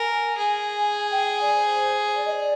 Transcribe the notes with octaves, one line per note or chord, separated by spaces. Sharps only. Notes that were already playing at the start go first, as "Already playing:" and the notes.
Already playing: A#4 G#5
G#4
G#5
G5
G5
D5
C5
D5
D#5
D5